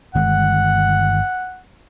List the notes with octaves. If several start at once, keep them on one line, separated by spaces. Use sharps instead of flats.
G1 D#3 G#3 F#5